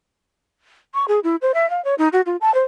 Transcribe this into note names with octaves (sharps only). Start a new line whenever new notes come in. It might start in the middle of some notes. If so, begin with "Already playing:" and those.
C#6
G#4
E4
C5
E5
F5
C#5
D#4
F#4
F4
A5
C5